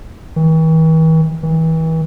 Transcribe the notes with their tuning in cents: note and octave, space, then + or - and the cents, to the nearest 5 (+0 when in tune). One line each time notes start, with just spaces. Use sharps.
E3 -45
E3 -35